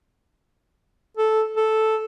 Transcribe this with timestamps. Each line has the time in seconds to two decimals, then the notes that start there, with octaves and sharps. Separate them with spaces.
1.17 A4
1.56 A4